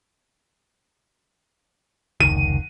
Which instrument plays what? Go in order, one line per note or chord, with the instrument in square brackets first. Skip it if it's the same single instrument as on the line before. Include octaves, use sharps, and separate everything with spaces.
[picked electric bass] F1 C#2 D#3 [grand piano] D#7